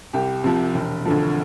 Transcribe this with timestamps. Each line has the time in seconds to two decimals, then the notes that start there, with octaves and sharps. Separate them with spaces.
0.13 C2 G4
0.44 C3 F3
0.74 E1
1.05 D2 D3 F3